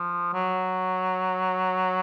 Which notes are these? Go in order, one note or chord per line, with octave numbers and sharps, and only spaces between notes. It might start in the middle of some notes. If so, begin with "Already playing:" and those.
Already playing: F3
F#3